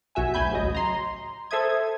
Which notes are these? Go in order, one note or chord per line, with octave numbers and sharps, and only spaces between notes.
B1 F#4 E5 G#5
D2 G#5 B5 G6
A1 C#3 F#3 D#5
A#5 C6
A4 C5 E5 D#6 G#6